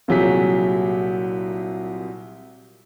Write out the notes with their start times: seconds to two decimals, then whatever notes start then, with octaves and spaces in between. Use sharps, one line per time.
0.08 C2 A#2 F#3 G4 G#4 B6